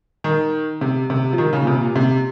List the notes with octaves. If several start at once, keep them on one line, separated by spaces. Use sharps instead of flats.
D#3
C3
C3
F3
D#3
C#3
A#2
C3
A#2
C3